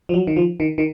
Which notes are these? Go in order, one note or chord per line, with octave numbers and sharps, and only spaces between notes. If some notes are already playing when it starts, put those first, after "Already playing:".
F3
F#3
D#3
F3
D#3
D#3